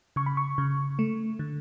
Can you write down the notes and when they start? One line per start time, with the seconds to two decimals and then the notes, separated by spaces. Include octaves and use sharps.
0.16 C#3 C#6
0.26 B5
0.37 C#6
0.58 C#3
0.99 A3
1.39 D3